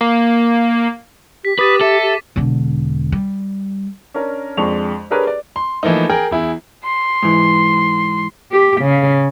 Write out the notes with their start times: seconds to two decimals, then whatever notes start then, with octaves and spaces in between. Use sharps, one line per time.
0.01 A#3
1.45 G4 B6
1.59 G4 B4 D6 D#6 A6 D#7
1.81 A4 E5
2.03 G4
2.36 E1 D3
3.12 G3
4.14 C#4 D4 A#4
4.57 F2 G#3 D4 C#6 F7
5.10 D4 G4 G#4 A#4 B4 C#5
5.27 D5
5.56 C6
5.83 E3 F3 A3 A#3 D#4
6.09 G#4 A#4 G5
6.31 E2 E4 G#4
6.84 C6
7.23 G#2 E3
8.51 G4
8.81 C#3